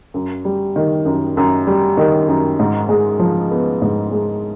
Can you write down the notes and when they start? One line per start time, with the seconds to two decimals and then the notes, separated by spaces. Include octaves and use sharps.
0.14 F#2
0.45 G3
0.76 D#3
1.05 F#2
1.37 F#2
1.67 G3
1.97 D#3
2.28 F#2
2.59 G#2
2.89 G#3
3.19 F3
3.51 B3
3.82 G#2
4.11 G#3